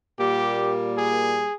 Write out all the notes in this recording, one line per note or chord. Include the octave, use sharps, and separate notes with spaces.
A#2 G3 A#3 G4
G#4